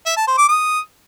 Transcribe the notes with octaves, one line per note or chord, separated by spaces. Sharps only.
E5
A5
C5
D6
D#6